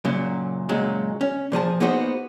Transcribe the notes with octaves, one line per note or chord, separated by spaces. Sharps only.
F#2 A#2 C#3 F#3
F#2 A#2 C#3 F#3 G#3
C#4
A#2 F3 G#4 A5
A#3 B3 D#4 F#4 G#4 C5